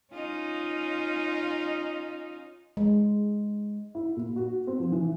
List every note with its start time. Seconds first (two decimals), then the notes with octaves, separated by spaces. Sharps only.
0.13 C#4 D#4 F4
2.77 G#3
3.95 E4
4.17 A#2
4.36 F#4
4.67 C4
4.80 F3
4.92 E3